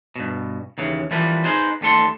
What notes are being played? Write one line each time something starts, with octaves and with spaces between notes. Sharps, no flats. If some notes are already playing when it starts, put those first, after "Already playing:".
G2 B2
D#2 C#3 E3
E3 F3 G3 A#3 B4
D#4 G#4 B4 C5
D#2 G3 A3 A4 C6